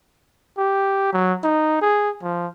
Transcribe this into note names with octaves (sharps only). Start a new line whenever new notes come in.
G4
F#3
D#4
G#4
F3